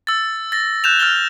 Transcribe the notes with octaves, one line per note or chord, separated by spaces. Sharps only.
E6 A6
A6 A#6
F#6 G6 E7 F7
F6 A6 F7 G7